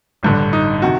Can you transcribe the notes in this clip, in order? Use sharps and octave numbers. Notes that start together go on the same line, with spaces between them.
A1 G2 D3
D#4
C3 D#3 F#4